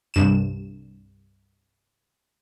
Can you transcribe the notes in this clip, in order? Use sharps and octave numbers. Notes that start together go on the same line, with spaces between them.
C2 G2 E7